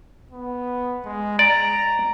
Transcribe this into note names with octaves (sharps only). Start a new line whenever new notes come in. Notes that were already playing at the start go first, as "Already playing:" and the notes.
B3
G#3
D5 A#5